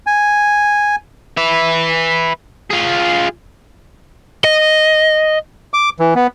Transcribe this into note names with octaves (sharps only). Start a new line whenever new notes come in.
G#5
B4 E5
F4 G#4
D#5
D6
E3
B3